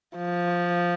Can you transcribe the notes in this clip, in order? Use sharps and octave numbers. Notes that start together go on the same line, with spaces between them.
F3